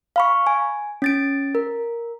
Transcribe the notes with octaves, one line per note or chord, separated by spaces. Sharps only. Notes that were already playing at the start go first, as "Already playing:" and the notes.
F5 B5 C#6
G#5
C#4 A6 D7
A#4